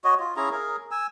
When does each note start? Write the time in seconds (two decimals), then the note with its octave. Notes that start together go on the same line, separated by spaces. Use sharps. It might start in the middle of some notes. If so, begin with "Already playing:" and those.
0.04 F#4 C#5 D#5
0.20 F4
0.37 C#4 E4 G#4 A#5
0.51 G#4 A#4
0.91 G#5 E6